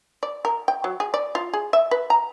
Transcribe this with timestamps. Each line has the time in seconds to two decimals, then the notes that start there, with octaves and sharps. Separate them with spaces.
0.23 D5
0.45 A#4
0.68 G5
0.84 F#3
1.00 G#4
1.14 D5
1.35 F4
1.54 G#4
1.73 E5
1.91 B4
2.10 A#5